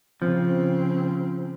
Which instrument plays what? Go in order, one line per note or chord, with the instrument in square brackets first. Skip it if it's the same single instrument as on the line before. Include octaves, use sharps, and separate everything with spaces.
[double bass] C#3 C4 [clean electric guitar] F3